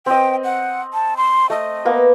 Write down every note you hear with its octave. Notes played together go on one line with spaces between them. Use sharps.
C4 D#5 G5
F#5
A5
C6
A3 D#5
A#3 B3